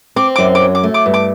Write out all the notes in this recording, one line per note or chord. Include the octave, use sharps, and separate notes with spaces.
C4 D6
F#2 D6
D6
F#3
D6
A3
D6
G2
D6